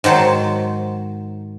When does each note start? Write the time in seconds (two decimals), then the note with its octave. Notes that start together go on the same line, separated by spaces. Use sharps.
0.04 G#2 D#3 F#3 C5 A5